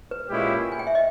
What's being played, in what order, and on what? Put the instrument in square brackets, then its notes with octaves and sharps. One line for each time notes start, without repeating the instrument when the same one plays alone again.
[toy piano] B4
[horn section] A#2 G#3 C#4 E4 G4
[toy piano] G#5
G5
E5
D#5